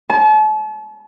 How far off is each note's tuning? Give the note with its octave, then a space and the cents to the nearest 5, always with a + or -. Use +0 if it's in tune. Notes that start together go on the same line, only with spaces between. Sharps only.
A5 -40